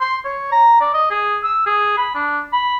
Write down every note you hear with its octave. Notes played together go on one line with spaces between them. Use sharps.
C6
C#5
A#5
D5
D#5
G#4
E6
G#4
B5
D4
B5